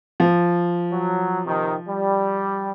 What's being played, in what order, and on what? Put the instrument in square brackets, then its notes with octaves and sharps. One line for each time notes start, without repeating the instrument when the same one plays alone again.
[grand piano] F3
[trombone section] F#3
C3 D#3
G3